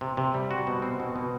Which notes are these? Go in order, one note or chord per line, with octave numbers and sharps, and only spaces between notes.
C3
C3
G3
F#4
B2
C4
B2
B2